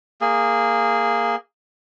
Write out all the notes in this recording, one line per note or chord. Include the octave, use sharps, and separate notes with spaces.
A#3 G#4